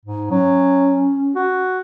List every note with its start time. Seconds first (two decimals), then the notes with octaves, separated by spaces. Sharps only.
0.05 G#2
0.30 F#3 C#4
1.35 F#4